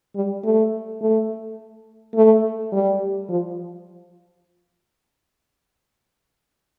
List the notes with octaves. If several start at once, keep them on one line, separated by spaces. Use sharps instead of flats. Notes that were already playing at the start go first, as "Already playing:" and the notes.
G3
A3
A3
A3
G3
F3